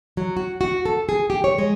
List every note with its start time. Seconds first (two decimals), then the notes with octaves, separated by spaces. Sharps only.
0.17 F#3
0.37 F#4
0.61 F#4
0.86 A4
1.09 G#4
1.30 G4
1.44 C#5
1.58 G#3